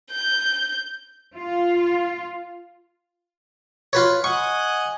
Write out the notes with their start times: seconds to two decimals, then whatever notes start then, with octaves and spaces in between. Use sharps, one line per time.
0.11 G6
1.35 F4
3.93 F4 B4 C#5
4.24 D#5 F#5 G#5 C#6